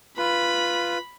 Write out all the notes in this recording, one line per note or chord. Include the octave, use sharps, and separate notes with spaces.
F4 B4 B5